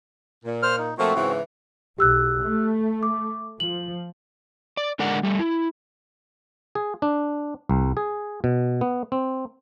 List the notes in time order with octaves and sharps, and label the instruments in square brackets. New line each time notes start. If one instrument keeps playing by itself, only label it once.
[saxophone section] A#2
[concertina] C5 F6
D#4
[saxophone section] A#2 F3 A3 [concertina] C4 F#4
[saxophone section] G#2 C#3 E3
[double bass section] B1 [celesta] G4 E6 F#6
[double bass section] A3
[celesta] D6
[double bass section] F3 [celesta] F#7
[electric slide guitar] D5
D3 G#3 A#4 D5 F#5
G3 A3
E4
[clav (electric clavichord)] G#4
D4
C2
G#4
B2
B3
C4